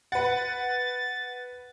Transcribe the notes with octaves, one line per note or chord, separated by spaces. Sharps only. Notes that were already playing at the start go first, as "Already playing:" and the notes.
B4 F#5 A6